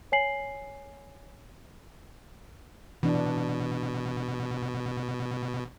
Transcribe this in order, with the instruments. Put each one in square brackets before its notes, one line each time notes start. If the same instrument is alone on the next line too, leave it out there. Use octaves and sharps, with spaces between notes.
[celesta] C#5 G#5 C7 F#7
[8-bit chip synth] B2 [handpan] E3 D4